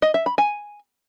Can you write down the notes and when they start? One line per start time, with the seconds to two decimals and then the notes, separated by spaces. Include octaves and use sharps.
0.02 D#5
0.14 E5
0.26 B5
0.38 G#5